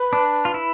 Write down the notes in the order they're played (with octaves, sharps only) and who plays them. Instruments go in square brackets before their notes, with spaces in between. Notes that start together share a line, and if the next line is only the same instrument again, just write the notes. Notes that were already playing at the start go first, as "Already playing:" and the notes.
Already playing: [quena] B4
[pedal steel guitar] D4
F4
E4